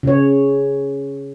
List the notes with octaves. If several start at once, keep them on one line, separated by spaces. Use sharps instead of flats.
C#3 C#5